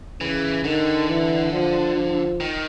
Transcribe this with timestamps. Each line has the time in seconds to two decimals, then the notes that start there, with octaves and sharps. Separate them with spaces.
0.21 C#3 E3
0.64 D3 D#3
1.09 E3
1.53 F3
1.96 F3
2.40 D#3